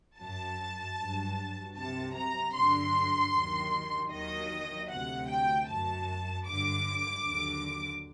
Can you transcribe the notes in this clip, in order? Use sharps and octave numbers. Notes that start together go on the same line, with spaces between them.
F#2 F#3 A5
G2 F#3
C2 C3 F#3 A5
A#5
G2 D3 F#3 C6
D#2 D#3 F#3
D#2 D#3 F#3 D#5
D2 C3 F#3 F#5
G5
F#2 F#3 A5
G2 D3 F#3 D6
D#2 D3 F#3